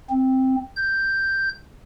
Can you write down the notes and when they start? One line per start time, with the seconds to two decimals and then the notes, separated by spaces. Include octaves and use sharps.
0.10 C4
0.76 G6